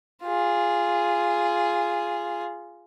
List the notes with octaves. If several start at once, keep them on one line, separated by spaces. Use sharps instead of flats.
F4 G#4